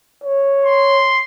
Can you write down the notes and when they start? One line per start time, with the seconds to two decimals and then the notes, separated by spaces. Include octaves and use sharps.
0.24 C#5
0.65 C6